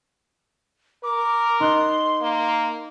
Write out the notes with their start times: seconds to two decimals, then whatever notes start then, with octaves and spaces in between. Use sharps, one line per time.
1.04 A#4 D6
1.60 D#4 C6 F#6 A6
2.22 A#3